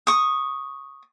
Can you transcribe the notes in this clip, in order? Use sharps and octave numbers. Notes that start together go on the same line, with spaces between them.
C#6 D#6